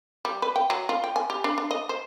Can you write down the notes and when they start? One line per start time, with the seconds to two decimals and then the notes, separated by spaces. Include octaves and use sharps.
0.25 G3
0.42 B4
0.56 G5
0.70 F#3
0.89 F4
1.04 G5
1.16 G#5
1.30 G4
1.44 D4
1.58 D4
1.71 D#5
1.89 C5